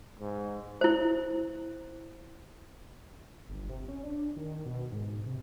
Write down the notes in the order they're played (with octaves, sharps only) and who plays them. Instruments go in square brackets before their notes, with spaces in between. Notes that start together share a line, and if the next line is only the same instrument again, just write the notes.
[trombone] G#2
[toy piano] E4 C5
[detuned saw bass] G1
C3
C#4
D4
D#3
B2
G#2
C3